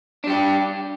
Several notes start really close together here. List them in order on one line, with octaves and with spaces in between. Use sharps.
D4 G3 G4